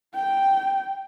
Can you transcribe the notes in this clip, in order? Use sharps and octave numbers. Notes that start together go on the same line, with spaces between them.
G5